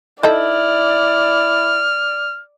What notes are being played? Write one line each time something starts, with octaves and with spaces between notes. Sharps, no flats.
D#4 E4 A4 D5 E5 F6